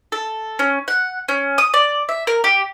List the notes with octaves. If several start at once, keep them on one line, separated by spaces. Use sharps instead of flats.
A4
C#4
F#5
C#4
D#6
D5
E5
A#4
G4